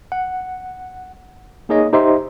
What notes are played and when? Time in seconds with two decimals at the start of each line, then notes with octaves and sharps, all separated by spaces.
0.12 F#5
1.69 A#3 D#4 G#4 C#5 D#5
1.93 D#4 G4 C5 D#5 E5 C6